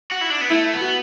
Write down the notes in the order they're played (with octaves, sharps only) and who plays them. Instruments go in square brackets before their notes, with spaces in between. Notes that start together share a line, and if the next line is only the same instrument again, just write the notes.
[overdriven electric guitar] F#4
E4
D4
B3
[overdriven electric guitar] A3 [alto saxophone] E4
[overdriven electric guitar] B3
[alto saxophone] F#4